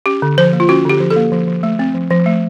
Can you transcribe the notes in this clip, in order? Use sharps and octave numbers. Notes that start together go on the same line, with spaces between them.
C#4 G4
D3
F3 C5
A#3
F4
C#4 F#4
D3 G4
F3
A4
A#3
F3
F3
A3
C4
F3
F3
A3